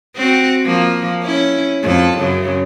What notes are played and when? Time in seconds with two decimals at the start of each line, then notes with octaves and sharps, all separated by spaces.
0.16 C4 F#4
0.65 F3 A#3
1.23 C#4 E4
1.83 F2 A4
2.18 F#2 C#3